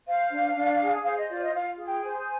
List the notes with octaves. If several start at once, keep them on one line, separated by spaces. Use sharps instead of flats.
C5 F5
D4
D4
G#4
C5 F5
D#5
F4 D5
D#5
F4 F5
G#4
G5
C5 G#5